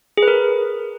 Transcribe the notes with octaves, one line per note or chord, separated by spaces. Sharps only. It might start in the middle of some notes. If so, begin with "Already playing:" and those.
G#4
B4
A#4